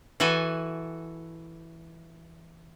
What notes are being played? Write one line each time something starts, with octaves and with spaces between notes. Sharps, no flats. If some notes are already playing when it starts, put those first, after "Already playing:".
E3 F#4 A4 G#5